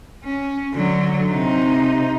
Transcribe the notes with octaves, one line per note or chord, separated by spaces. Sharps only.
C#4
D3 F#3
C3 D#4